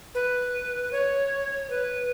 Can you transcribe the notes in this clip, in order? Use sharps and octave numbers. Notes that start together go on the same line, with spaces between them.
B4
C#5
B4